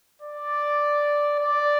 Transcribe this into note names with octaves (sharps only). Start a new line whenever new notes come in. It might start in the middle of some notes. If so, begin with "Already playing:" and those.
D5
D5